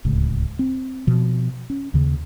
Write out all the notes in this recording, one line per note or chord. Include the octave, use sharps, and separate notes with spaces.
D1 C#2
C4
B2 F3
C#4
D#2 C#3